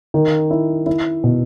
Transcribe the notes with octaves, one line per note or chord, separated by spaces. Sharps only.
D#3
E4
E4
B2